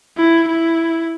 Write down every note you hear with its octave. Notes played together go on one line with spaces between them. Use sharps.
E4
E4